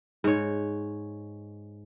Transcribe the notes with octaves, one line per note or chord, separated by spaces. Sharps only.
G#2 C#5